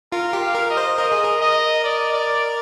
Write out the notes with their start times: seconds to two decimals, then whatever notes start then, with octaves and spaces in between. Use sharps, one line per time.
0.12 F4 A#4
0.33 G4
0.41 F5
0.55 A#4
0.70 D#5
0.77 C5
0.98 A#4 D#5
1.12 G#4
1.24 A#4
1.41 D#5
1.84 D5
2.13 D5